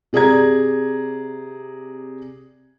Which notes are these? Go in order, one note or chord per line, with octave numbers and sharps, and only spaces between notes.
C3 G#4 D5 A#5 G#6